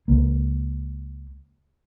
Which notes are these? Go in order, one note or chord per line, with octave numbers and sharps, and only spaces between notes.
C#2 A#3